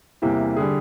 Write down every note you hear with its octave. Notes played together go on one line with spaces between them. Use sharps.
E2 C3 E3 G3 A#3 G4
D3 G3 G#4